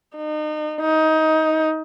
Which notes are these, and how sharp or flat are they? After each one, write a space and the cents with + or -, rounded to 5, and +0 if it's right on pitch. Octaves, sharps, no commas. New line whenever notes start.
D#4 -35
D#4 +20